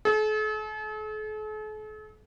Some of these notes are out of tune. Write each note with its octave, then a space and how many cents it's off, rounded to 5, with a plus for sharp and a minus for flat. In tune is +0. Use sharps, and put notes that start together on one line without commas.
A4 -45